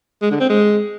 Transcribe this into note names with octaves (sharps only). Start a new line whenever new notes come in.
G#3
D3
C4
G#3